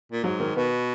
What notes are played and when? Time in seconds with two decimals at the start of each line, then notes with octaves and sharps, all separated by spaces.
0.12 A#2
0.24 G#2 F#3
0.40 D#3
0.56 B2 B3